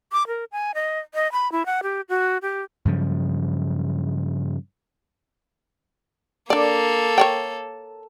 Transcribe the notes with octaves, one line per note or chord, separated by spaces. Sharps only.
D6
A#4
G#5
D#5
D#5
B5
E4
F#5
G4
F#4
G4
G2 C#3 F3 F#3
A#3 D4 A4 D5
C#5 D5 G5